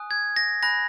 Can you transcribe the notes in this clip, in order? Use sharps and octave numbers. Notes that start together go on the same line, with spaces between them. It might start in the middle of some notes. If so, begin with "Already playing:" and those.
Already playing: G#5 D#6 F#6
G#6
A#6
G#5 B5 F#6 A#6